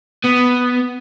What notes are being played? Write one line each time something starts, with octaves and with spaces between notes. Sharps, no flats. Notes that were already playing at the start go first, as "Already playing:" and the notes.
B3